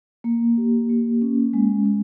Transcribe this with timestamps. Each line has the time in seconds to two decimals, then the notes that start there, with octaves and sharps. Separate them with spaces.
0.24 A#3
0.58 G4
0.90 A#3
1.22 C#4
1.53 G#3
1.85 G#3